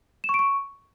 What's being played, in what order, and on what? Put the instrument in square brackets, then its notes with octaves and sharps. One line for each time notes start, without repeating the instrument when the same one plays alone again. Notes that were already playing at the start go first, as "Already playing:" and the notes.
[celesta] E7
C#6
D7
C#6